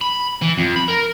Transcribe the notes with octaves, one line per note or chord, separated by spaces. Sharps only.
B5
E3
F2
B5
A#4